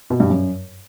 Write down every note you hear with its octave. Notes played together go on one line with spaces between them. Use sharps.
B2
G2
F#2